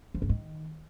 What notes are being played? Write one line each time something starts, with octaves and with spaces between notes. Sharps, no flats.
F3
G#2
D#3